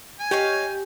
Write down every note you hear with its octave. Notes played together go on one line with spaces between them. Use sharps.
G#5
D#4 G4 C#5 F5